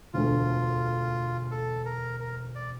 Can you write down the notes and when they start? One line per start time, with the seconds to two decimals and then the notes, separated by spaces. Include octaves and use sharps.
0.14 E1 D2 D3 A3 F4
1.51 A4
1.86 A#4
2.20 A#4
2.55 D5